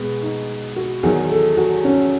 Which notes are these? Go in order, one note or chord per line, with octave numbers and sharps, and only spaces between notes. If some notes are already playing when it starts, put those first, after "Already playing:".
Already playing: B2 G#3 B3
D#4
F#4
E2 D#3 F#3 G#4
A4
F#4
C#4